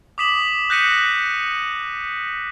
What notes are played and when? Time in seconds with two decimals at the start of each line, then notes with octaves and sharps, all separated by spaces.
0.18 D6 D#6 B6 E7 F#7
0.70 F#6 G6 A#6 B6 C#7 D#7